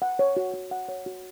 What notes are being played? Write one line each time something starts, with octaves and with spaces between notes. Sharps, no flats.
F#5
C#5
F#4
F#4
F#5
C#5
F#4